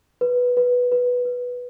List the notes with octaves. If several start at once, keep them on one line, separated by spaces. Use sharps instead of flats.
B4
B4
B4
B4